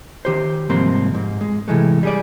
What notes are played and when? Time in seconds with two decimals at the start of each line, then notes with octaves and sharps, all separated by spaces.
0.25 D#3 G4 C5
0.69 C2 G#2 F3 A#3 C4 C6
1.15 G#2
1.41 G#3
1.68 C3 E3 G#3 A3
2.03 G3 G#4 D5